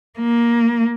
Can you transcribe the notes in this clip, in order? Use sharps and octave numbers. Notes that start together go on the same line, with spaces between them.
A#3